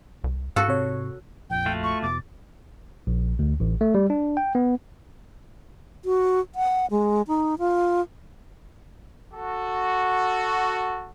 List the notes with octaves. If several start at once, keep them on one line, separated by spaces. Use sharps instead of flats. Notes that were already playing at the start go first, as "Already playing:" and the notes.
C2
G#2 F#4 A4 F5
C3 C#5
A#1 F2 G5
A3 F4 F#4
C#6
E2 B2 D6 A6
A#1
D2
A1
A3
G3
D4
G5
B3
F#4
F#5
G#3
D#4
F4
F#4 A4